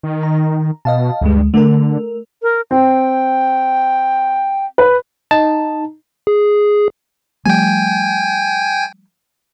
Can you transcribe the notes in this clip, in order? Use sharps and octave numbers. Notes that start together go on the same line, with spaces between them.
D#3
A#5
B2 D#5 F5 A5
D2 G2 G#3
D3 A3 A#4
A#4
C4 G5
B4
D#4 A5
G#4
F3 G3 A3 G5 G#5